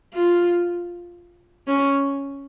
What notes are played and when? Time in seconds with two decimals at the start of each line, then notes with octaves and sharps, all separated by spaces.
0.14 F4
1.67 C#4